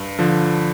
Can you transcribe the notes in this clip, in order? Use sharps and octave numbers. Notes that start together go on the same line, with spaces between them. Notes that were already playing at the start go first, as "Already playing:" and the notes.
Already playing: G2
D3 F3